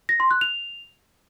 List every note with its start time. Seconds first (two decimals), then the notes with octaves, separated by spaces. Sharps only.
0.09 A#6
0.20 C6
0.31 F#6
0.41 F7